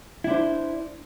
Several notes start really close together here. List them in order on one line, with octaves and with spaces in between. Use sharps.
E4 D4 C5